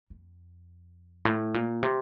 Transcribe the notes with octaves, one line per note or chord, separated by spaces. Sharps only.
F2
A2
A#2
C3